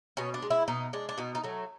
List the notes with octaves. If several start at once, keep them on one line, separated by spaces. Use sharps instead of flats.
B2 C#4
D4
G#3
E4
B2 D#4
G#3 D4
D4
B2 D#4
D#4
F#3 A3